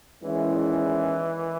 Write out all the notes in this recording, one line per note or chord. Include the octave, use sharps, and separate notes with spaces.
E2 D#3 E3 G#3 C#4 E4